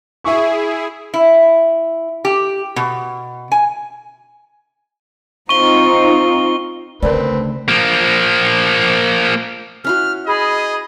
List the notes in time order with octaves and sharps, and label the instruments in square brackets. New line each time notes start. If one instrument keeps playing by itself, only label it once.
[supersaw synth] E4 G#4 [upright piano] E5 C#6
[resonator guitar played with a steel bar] E4
G4
B2
G#5
[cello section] C4 D#4 F4 [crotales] C#6 G7
[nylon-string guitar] D2 A3 [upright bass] C#3 [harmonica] C4 B4 [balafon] A#4 D5
[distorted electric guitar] F3 A#3
[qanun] C#4 E4 F#4 [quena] F6
[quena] G#4 [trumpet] D#5 [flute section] B5